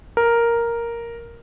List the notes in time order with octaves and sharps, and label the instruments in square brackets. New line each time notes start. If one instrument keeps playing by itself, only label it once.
[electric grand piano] A#4